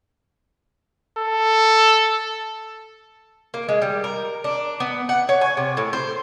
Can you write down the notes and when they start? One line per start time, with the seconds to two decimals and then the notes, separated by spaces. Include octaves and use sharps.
1.18 A4
3.54 A#3
3.69 G#3
3.82 G3
4.04 A#4
4.44 D4
4.80 B3
5.09 F#5
5.29 C#5
5.41 G#5
5.57 C3
5.77 A2
5.93 C5